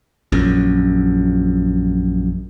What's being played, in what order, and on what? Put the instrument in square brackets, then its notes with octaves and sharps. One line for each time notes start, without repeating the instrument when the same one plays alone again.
[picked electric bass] A#1 F#2